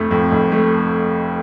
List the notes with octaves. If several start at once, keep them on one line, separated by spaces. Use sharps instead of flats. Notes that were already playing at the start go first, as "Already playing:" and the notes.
Already playing: F1 F2 A3
F2
F1
A3